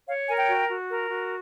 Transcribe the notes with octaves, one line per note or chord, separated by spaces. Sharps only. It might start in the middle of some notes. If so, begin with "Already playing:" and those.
C#5 F5
A#4 G#5
G5
F#4
F#4
A#4
F#4